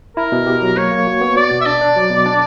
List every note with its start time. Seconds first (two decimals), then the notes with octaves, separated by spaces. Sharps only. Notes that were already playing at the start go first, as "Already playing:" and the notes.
0.17 E4 A#4
0.32 B2
0.47 G4
0.62 F#3
0.77 A#3 C#5
0.91 A#3
1.07 F#4
1.21 B3
1.36 F#4 D5
1.51 B2
1.61 E5
1.66 D4 D5
1.81 D4
1.96 F#3
2.10 B2
2.26 D4